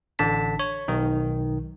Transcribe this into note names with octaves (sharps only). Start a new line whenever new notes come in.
A1 D3 A5 B6
C#5
B1 D#3